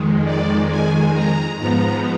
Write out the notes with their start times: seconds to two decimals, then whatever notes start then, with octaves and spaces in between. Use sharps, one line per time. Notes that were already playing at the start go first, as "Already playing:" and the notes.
Already playing: F2 D#3 G#3
0.24 D5
0.69 G#5
1.13 A#5
1.56 G#2 F3 B3 A#5